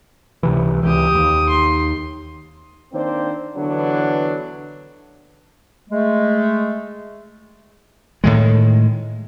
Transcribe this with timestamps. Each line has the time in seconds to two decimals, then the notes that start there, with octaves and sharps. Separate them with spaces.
0.43 C#2 C3 E3
0.83 C#2 E3 G4 D#6
1.15 D#2
1.49 C6
2.92 D#3 A#3 C4 D4 C5
3.56 D3 E3 F#3 B3 D4
5.89 G#3 A3
8.24 A2 D#3 G#3